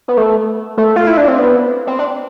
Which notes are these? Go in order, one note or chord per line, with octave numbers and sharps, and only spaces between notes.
B3
A3
A3
F4
E4
D4
C4
B3
C4
D4